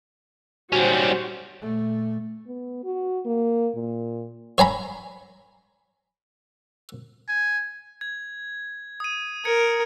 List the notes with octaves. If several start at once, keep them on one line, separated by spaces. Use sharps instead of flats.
G3 C#4 F#4 C5
A#2 A3
B3
F#4
A#3
A#2
C#5 G#5 A#5 B5
G#5
G#6
D#6 D#7
A#4 G#6 C#7